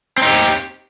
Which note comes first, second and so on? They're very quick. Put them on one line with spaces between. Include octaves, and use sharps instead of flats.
C4 D#4 G4